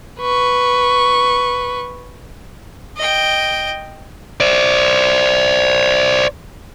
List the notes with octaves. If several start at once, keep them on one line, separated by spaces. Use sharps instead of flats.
B4 C#6
D#5 G5
C5 D5